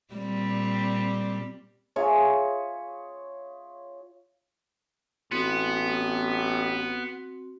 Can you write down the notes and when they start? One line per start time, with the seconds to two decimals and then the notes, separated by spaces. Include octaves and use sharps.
0.14 A#2 G3 C4
1.96 F4 G#4 C#5 E5
5.31 A1 B3 C4 F#4